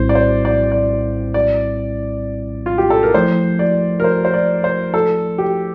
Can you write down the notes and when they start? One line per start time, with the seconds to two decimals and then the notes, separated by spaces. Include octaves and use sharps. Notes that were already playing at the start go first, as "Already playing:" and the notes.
Already playing: A#1 A2 G3 C4 E4 C5
0.09 D5
0.15 C5
0.45 D5
0.72 D5
1.34 D5
2.66 F4
2.78 G4
2.90 A4
3.03 A#4
3.14 F3 A3 E4 C5
3.59 D5
4.00 A#4
4.04 C5
4.25 C5
4.34 D5
4.64 C5
4.94 A4
5.38 G4